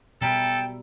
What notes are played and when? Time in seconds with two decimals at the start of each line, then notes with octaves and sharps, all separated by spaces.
0.21 B2 G3 A4 A#4 E5 G5